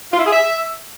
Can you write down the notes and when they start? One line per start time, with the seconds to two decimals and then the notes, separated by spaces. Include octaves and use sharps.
0.13 F4
0.19 E4
0.26 G#4
0.33 E5